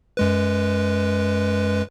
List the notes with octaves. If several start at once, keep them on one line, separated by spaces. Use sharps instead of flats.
F#2 G#3 B4